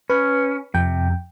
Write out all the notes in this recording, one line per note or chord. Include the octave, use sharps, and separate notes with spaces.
C#4 B4
F2 C3 G5